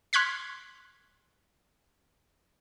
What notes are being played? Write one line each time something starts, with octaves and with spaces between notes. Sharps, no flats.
C6 F6 F#6 G#6 B6